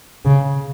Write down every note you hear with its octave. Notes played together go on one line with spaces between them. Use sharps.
C#3